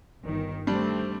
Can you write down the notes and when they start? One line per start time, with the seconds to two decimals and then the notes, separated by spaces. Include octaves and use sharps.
0.22 G1 D#3
0.67 G3 A3 C4 D4